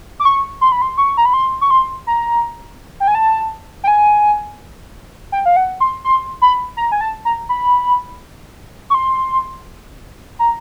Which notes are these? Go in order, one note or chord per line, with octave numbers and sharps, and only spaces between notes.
D6
C#6
C6
B5
C6
C#6
A#5
B5
C6
C#6
C6
A#5
G5
G#5
A5
G5
G#5
G5
F5
F#5
C6
C6
B5
A#5
G#5
A5
A#5
B5
C#6
C6
A#5